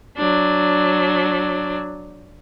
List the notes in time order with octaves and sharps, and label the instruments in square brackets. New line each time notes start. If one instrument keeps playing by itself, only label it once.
[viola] F#3 D4